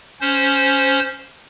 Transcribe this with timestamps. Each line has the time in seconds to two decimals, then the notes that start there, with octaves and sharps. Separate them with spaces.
0.21 C#4 C5